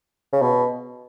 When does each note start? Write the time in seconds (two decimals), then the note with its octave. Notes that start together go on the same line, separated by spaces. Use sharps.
0.33 C#3
0.42 B2